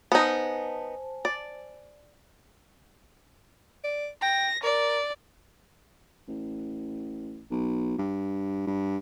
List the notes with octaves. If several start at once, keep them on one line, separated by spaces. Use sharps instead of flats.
B3 D#4 C5 G#5 A5
D5
D5
G5 A#6
A#4 D5
A1
B1
G2
G2